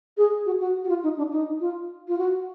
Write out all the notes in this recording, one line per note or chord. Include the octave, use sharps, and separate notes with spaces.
G#4
F#4
F#4
F#4
F4
D#4
D4
D#4
F4
F4
F#4